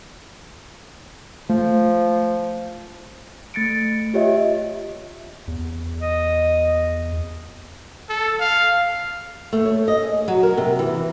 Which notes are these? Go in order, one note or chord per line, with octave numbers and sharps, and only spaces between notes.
F3 A3
A3 A6 C#7 D7
F4 G4 C#5 D#5 E5
E2
D#5
A4
F5
A3
C#5
D#5
G#4
F#3
A#4
C3
E3